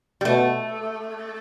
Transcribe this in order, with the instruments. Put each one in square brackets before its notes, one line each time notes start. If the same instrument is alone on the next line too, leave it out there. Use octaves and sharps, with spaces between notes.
[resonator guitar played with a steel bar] G3
[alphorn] B2 [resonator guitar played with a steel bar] A3